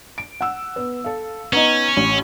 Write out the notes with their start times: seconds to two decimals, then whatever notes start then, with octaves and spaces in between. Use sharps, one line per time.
0.18 D7
0.41 F#5 E6
0.76 B3
1.04 A4 F5
1.53 B3 C#4 D#4 D#5
1.97 A1